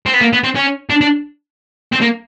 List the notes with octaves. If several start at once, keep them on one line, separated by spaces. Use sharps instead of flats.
C4
B3
A#3
B3
C4
C#4
D4
D4
C4
A#3